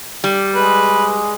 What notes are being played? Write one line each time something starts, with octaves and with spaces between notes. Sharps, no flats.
G3
G#3 B4